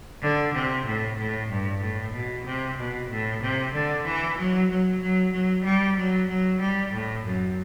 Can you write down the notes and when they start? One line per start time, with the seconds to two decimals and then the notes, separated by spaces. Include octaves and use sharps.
0.22 D3
0.54 C3
0.86 A2
1.17 A2
1.49 G2
1.81 A2
2.13 B2
2.45 C3
2.77 B2
3.10 A2
3.41 C3
3.73 D3
4.05 E3
4.37 F#3
4.69 F#3
5.01 F#3
5.32 F#3
5.64 G3
5.96 F#3
6.28 F#3
6.60 G3
6.92 A2
7.24 F#2